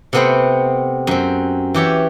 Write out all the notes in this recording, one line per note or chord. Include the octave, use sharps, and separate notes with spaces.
C3 A3 B3 C4 B4 C5
F#2 C4
E3 G4 C#5 E5